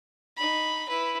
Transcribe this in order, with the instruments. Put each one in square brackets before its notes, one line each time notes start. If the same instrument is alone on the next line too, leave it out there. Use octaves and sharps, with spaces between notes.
[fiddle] D#4 B5
E4 B4